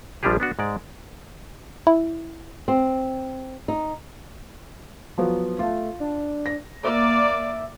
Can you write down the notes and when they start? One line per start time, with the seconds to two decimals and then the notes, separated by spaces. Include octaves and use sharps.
0.23 A#1 F3 G3 D4 G4 G#4
0.40 B3 D4 F#4
0.59 G#2 G#3 D5
1.87 E4
2.68 C4
3.68 D#4
5.18 F3 F#3 B3
5.59 A3 F4
6.00 D4
6.46 A#6
6.84 A#3 D5 E5